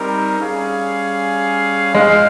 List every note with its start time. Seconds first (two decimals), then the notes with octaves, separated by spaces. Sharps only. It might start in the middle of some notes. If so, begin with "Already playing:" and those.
Already playing: G3 C4 D#4 A#4
0.39 G3 C#4 G#4 C#5 F5
1.95 G#3 F4 G#4 C5 F5